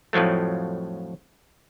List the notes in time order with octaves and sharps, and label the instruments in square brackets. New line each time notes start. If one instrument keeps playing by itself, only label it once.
[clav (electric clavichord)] F2 A2 F3 F#3 A3